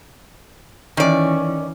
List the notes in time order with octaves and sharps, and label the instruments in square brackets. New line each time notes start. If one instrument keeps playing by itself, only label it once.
[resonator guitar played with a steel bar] D#3 D5 [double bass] E3 C#4